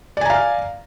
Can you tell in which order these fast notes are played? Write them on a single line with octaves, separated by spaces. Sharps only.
D5 G#5 A#5 F5